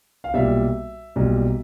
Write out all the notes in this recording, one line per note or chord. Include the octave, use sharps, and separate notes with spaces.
F5
B1 A#2 G3 E5
B1 A#2 G3